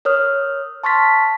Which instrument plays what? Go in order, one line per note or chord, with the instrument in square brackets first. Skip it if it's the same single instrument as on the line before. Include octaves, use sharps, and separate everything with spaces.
[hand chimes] A#4 C#5 D#6 F6
A5 C6 C#6 F6 A6 B6